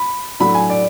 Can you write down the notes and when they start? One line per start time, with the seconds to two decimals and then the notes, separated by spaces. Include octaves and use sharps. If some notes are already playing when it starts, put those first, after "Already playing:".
Already playing: B5
0.40 A2 F#3 A3 D4 B5
0.55 G#5
0.70 D5